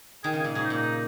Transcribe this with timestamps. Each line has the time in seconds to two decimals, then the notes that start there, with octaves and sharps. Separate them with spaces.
0.24 D#3 G#4
0.33 C#3
0.39 G#4
0.44 A#2
0.55 G#2 G#4
0.65 D#4
0.70 A#2
0.76 D#4